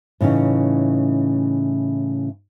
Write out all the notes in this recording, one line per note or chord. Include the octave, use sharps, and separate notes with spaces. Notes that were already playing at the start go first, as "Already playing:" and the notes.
A2 C#3 E3 C#4 D#4